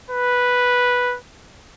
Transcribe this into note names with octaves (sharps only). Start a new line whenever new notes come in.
B4